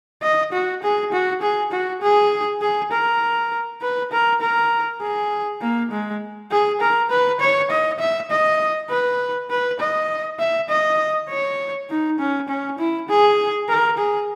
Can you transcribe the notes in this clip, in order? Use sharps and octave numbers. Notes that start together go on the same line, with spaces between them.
D#5
F#4
G#4
F#4
G#4
F#4
G#4
G#4
A#4
B4
A#4
A#4
G#4
A#3
G#3
G#4
A#4
B4
C#5
D#5
E5
D#5
B4
B4
D#5
E5
D#5
C#5
D#4
C#4
C#4
E4
G#4
A#4
G#4